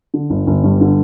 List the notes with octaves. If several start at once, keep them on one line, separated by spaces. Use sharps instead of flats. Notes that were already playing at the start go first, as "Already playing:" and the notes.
D3
G1
G1
G2
D3